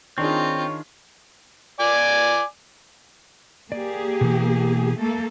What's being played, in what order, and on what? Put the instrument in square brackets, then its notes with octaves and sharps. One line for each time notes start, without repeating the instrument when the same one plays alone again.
[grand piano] D#3 D4 G#4 [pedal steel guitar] C4 [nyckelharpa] D#4 F4 [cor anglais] C#5
[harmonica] D5 G#5 D6
[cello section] A#3 G4 G#4 [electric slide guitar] D5
[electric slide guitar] B2 E3
[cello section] A3 A#3 A4